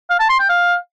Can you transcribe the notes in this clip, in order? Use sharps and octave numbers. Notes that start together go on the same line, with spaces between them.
F5
A5
C6
G5
F5